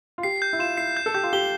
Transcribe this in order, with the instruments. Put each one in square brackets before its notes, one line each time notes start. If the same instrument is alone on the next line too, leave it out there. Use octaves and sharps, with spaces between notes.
[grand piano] F4
[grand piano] G4 [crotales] C7
[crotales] G6
[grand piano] E4
[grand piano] F4 [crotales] E7
[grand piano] E4 [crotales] C7
[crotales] G6
[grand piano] A4
[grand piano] G4 [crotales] G6
[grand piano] F4
[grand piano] G4 [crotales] G7